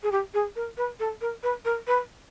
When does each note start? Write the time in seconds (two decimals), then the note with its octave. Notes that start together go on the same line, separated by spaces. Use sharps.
0.03 G#4
0.12 G4
0.34 G#4
0.56 A#4
0.77 B4
1.00 A4
1.21 A#4
1.43 B4
1.65 A#4
1.87 B4